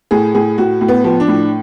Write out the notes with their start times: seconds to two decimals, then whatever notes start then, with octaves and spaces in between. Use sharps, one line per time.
0.11 A2 G#4
0.35 A2 G#4
0.58 A2 F#4
0.81 A2
0.88 B3
1.04 F3
1.20 D4
1.28 A2